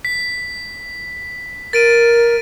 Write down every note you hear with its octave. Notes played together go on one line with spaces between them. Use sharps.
B6
A#4 A6 D7 D#7